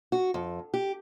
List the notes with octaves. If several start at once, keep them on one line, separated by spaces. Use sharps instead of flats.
F#4
F2
G4